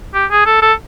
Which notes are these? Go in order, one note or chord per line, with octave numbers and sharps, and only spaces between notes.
G4
G#4
A4
A4